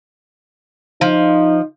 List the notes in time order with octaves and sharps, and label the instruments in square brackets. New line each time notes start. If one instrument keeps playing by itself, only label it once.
[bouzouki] F3 [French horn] D#4